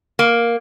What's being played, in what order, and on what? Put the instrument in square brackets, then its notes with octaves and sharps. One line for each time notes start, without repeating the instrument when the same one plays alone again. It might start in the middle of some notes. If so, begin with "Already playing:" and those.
[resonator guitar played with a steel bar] A#3